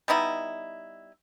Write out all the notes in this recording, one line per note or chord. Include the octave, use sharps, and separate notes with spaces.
G3 B3 D#4 E4